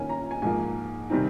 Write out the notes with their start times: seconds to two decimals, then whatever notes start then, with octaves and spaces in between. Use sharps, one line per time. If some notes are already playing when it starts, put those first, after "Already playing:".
Already playing: D#3 A#3 C#4 G#5
0.09 A#5
0.31 G#5
0.42 G#2 F3 A#3 G#5
1.10 C3 D#3 G3 C4 D#4